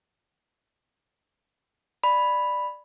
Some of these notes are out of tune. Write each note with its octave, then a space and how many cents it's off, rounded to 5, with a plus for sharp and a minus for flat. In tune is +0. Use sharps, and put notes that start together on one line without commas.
D5 +15 B5 +0